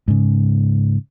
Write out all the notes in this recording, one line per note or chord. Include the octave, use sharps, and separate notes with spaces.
G#2 C#3